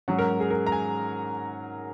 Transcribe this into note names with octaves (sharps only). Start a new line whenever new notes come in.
G#2 F#3 C#4 F#5
A#4
G#4
A#4
A#5
G#5